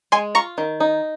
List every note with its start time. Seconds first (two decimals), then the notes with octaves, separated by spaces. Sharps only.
0.12 G#3 G#5 C6
0.35 F4 A#5 C#6
0.58 D#3
0.80 D#4